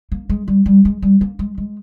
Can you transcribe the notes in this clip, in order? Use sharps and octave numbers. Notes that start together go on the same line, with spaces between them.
A#3
G#3
G3
G3
G#3
G3
A#3
G#3
G#3